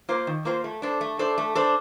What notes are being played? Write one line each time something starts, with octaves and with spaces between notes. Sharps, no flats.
A#3 F4 C5
D#3
A#3 F4 C5
A3
D4 A4 C5
A3
D4 A4 C5
A3
D4 A4 C5